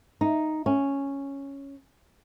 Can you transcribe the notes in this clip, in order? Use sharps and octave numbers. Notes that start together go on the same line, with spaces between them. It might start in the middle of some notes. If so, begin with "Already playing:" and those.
D#4
C#4